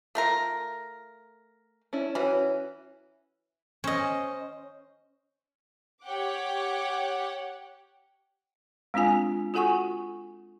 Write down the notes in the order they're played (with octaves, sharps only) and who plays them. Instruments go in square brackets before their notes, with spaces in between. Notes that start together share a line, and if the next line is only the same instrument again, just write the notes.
[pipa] A3 F4 A#4
[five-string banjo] C#4 D4 E4
[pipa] E3 [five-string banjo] C#4 F#4
[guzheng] C#4 [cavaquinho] C5 D#5
[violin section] G4 C#5 F#5 G5 D6
[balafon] G#3 C4 D4 F4 G#5
F4 F#4 A4 F#5 G#5 C#6